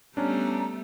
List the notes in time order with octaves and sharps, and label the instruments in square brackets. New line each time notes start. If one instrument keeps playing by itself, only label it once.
[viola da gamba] G3 A3 B3 [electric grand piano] C#4 D4 [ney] A#5